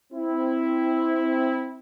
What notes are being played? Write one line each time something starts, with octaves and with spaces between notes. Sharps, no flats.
C4 E4